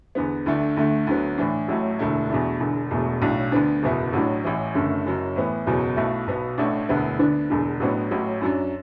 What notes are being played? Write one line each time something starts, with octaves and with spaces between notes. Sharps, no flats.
E2 D3 B3
D2 D3 A3 D4
D2 D3 A3
D2 D3 F#3 B3
A2 E3 D4
A1 A2 F#3 A3
E1 D2 D3 A3 E4
E2 B2 A3 D4
E1 E2 D3
E1 E2 B2 A3
B1 A2 F#3 D4
D2 D3 B3 D4
F#1 E2 B2 B3 E4
A1 A2 F#3 D4
A1 A2 E3
F#1 F#2 D3 A3
F#1 F#2 F#3
A2 E3 B3
F#1 E2 B2 F#3
B1 B2 A3 E4
B1 B2 B3
A1 A2 A3 D4
E1 D2 D3 B3 E4
D2 D3 B3 D4
E1 E2 D3
A1 A2 F#3 B3 D4
A1 A2 F#3
F#2 F#3 D4